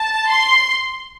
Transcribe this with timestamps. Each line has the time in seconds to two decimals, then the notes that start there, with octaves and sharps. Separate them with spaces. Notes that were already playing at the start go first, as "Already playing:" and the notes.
Already playing: A5
0.30 C6